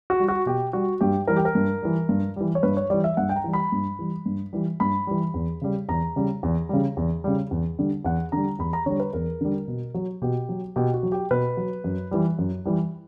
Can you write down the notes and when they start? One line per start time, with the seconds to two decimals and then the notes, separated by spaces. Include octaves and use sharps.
0.10 F#4
0.20 G3
0.28 F#4
0.46 B2 G4
0.73 G3 F#4
1.01 G2 G4
1.27 E3 G3 A#4
1.36 G4
1.45 A#4
1.55 G2
1.82 E3 G3
2.09 G2
2.36 E3 G3
2.55 C#5
2.63 G2 B4
2.77 C#5
2.90 E3 G3 D5
3.04 E5
3.17 G2 F#5
3.29 G5
3.36 A#5
3.44 E3 G3
3.53 B5
3.72 G2
3.99 E3 G3
4.26 G2
4.53 E3 G3
4.80 G2 B5
5.07 E3 G3
5.34 E2
5.62 C#3 G3
5.89 E2 A#5
6.16 C#3 G3
6.43 E2
6.69 C#3 G3
6.97 E2
7.24 C#3 G3
7.51 E2
7.79 D3 G3
8.05 E2 F#5
8.32 D3 G3 A#5
8.59 E2 B5
8.73 A#5
8.86 D3 G3 C#5
9.00 B4
9.13 E2 A#4
9.41 D3 G3
9.68 B2
9.94 F#3
10.22 B2 G4
10.49 F#3
10.76 B2 G4
10.94 F#4
11.03 F#3
11.12 G4
11.31 B2 B4
11.57 F#3
11.84 F#2
12.11 E3 G3
12.39 F#2
12.65 E3 G3